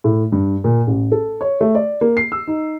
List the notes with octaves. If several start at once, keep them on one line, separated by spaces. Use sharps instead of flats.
A2
G2
A#2
A1
A4
C#5
A3
D5
A#3
C7
E6
D#4